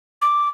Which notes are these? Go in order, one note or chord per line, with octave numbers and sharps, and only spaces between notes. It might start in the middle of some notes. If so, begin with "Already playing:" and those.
D6